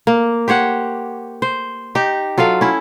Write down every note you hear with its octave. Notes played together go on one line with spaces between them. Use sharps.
A#3
G4 C5 C#5 F#5
C5
D#4 G4
F#3 F4 A4 F5
C#4 E4